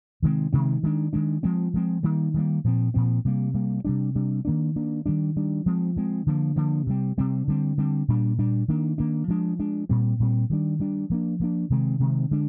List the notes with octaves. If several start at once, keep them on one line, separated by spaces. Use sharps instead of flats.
C3 D#3 G#3 C4
C3 D#3 G#3 C4
D#3 G#3 D4
D#3 G#3 D4
F3 G#3 C4
F3 G#3 C4
D#3 G3 A#3
D#3 G3 A#3
A#2 F3 C4
A#2 F3 C4
C3 G3 A#3
C3 G3 A#3
C3 G3 D4
C3 G3 D4
D#3 A#3 D4
D#3 A#3 D4
D#3 G3 D4
D#3 G3 D4
F3 G#3 C4
F3 G#3 C4
D3 F3 A#3
D3 F3 A#3
C3 G3 C4
C3 G3 C4
D3 G3 C4
D3 G3 C4
A#2 G3 D4
A#2 G3 D4
D#3 A#3 D4
D#3 A#3 D4
F3 G#3 D4
F3 G#3 D4
A#2 G3 C4
A#2 G3 C4
D#3 G3 D4
D#3 G3 D4
F3 A#3 D4
F3 A#3 D4
C3 D#3 G#3 C4
C3 D#3 G#3 C4
D3 G#3 D4